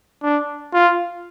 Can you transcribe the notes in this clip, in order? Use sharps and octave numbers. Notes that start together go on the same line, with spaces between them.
D4
F4